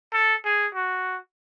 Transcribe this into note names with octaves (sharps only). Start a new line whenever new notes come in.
A4
G#4
F#4